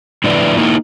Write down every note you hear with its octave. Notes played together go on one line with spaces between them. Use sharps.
A2 D3 F3 E4 B4 D5
A#3 D#4 E4